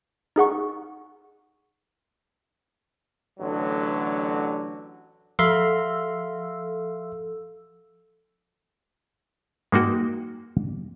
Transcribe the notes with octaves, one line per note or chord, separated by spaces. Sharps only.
D#4 G#4 F#5 C#6
A1 D3 F#3
F3 A4 E5 F5 C6 E6
G#3 A#3 D#4 F#4 G5